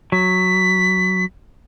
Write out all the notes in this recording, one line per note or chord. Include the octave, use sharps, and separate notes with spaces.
F#3 B6